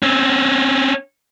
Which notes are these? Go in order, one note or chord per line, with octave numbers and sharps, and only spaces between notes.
C4 C#4